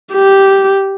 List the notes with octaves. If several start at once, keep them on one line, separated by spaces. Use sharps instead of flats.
G4